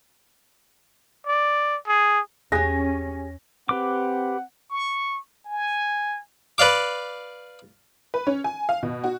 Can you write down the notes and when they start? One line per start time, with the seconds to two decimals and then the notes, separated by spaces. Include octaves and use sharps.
1.27 D5
1.88 G#4
2.52 E2 C#4 G4 G#4 D#6 F#6 A#6
3.69 C4 G4 B4 F#5 D6
4.71 C#6
5.46 G#5
6.58 B4 D5 F5 D6
8.14 B4
8.27 C#4
8.44 G#5
8.69 F5
8.83 B2
9.04 F#4